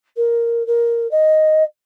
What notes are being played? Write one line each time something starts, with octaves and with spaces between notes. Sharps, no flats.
A#4
A#4
D#5